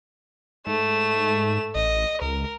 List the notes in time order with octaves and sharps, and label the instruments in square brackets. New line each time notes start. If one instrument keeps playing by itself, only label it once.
[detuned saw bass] G#2 [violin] A3 E7
[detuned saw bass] A1 [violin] D#5
[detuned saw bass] C#2 [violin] A#4